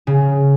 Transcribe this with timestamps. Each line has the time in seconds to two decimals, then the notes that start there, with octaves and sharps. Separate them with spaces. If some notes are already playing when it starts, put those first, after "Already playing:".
0.07 C#3